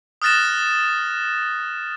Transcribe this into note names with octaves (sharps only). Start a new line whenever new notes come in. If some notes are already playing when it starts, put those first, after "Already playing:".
D#6 F6 F#6 A6 A#6 E7